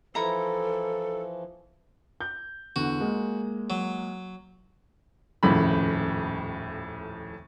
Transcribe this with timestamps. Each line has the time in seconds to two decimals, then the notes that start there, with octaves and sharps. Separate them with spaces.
0.15 E3 F3 E4 A4 A#5
2.21 G6
2.76 E2 D3 F#4
3.00 G#3 A#3
3.70 F#3
5.43 D#1 F2 A2 C#3 B5